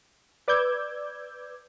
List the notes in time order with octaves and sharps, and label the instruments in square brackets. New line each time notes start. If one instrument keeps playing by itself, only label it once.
[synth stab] B4 D5 D6 E6 G6 G#6